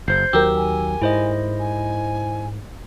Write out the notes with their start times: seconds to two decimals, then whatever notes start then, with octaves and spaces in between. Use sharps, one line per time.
0.08 F#1 C5 G6 C7
0.33 D#2 F#3 G4 A#4 E6
0.56 G#5
1.02 G#2 E4 C5 D#5
1.59 G#5